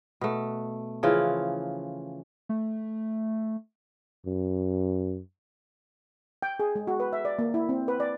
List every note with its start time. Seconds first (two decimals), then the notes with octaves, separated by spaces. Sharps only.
0.21 B2 A3
1.03 C#3 E3 F3 F4
2.49 A3
4.27 F#2
6.42 G5
6.59 G#4
6.76 G#3
6.87 F#4
7.00 B4
7.13 E5
7.25 D5
7.39 A#3
7.54 E4
7.69 C4
7.88 B4
8.00 D5